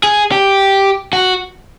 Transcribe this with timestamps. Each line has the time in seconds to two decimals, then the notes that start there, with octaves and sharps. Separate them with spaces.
0.04 G#4
0.32 G4
1.13 F#4